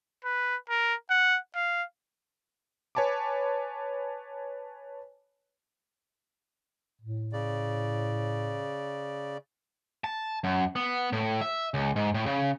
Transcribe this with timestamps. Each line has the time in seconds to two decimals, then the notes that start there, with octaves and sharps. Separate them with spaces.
0.25 B4
0.69 A#4
1.10 F#5
1.55 F5
2.95 B4 C#5 G#5 A5 B5 D6
7.01 A2
7.33 C#3 D5
10.04 A5
10.44 F#2
10.76 B3
11.12 A2
11.41 E5
11.74 C#2
11.96 G#2
12.14 A2
12.26 C#3